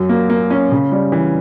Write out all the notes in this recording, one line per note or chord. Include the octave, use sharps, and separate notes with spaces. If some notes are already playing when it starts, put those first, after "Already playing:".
Already playing: F#2 F#3
A#3
A#3
C#4
C#3
G3
E3